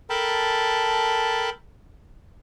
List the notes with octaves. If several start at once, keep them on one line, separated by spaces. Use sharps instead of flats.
A4 A#4 G5 A5 B5